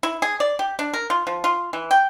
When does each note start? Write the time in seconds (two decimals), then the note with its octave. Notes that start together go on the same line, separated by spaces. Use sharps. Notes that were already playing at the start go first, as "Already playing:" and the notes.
0.03 E4
0.22 G#4
0.40 D5
0.59 G4
0.79 D4
0.93 A#4
1.10 F4
1.27 F3
1.44 F4
1.73 E3
1.91 G5